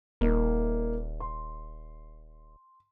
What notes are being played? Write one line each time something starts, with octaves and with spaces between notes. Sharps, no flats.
D#1 A#3 D#4
C6